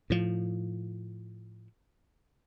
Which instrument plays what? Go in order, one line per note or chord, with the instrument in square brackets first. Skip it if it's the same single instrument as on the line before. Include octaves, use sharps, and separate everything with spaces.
[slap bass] A2 F3